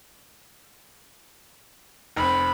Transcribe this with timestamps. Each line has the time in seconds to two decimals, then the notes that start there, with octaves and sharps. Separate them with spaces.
2.16 F1 C4 B5